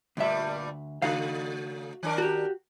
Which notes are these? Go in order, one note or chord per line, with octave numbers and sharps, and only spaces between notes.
D2 G2 A#2 G3 E5
C#3 A3 F#4 F5
D#3 D4 A#4
F#4 G4